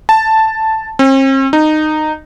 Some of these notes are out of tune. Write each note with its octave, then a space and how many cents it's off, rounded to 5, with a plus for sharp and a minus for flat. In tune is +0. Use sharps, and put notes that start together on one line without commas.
A5 +0
C4 +45
D#4 -15